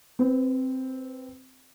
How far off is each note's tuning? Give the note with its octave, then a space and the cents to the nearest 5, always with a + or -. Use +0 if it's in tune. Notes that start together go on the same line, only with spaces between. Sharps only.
C4 +0 B4 +15